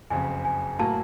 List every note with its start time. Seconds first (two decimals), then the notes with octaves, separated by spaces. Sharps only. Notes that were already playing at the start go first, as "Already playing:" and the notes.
0.10 F#1 F2 C#3 G#5
0.45 G#5
0.79 A2 F#3 A#3 A5